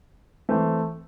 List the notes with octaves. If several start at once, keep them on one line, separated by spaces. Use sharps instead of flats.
E3 A3 C4